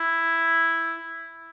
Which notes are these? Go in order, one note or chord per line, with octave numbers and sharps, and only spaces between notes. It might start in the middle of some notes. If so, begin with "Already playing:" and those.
Already playing: E4